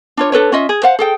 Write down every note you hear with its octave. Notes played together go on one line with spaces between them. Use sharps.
D4 F4 C#5
D4 A4 B4 C#5
C#4 F4 D#5 E5
G#4
C5 F5 F#5
G#4 A4 G5